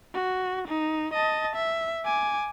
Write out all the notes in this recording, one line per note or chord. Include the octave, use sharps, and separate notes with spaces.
F#4
D#4
D#5 A5
E5
G#5 D6